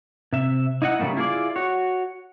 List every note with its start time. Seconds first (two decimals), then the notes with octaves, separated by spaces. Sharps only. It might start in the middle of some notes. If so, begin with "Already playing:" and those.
0.33 C3 E5
0.82 D#4 E4 D#5 F#5
0.99 C#3 F3 G3 A3 A#3
1.17 E4 F4 G#4 A#4 D5
1.56 F#4 C#5